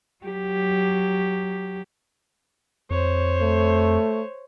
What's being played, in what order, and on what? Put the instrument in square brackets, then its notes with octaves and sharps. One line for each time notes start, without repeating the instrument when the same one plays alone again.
[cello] F#3 G4
[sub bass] F2 [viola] C5 C#5
[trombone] A3